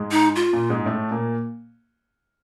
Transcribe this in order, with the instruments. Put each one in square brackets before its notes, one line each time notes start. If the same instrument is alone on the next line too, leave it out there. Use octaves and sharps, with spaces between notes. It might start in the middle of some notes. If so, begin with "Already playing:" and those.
Already playing: [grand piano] G#2 G#3
[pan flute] D#4
F4
[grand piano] A#2 A#3
G#2 G#3
A2 A3
A#2 A#3